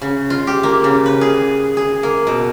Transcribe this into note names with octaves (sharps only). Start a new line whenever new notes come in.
C#3
F4
G4
A#3
C#3
B4
G#4
G#4
A#3
B2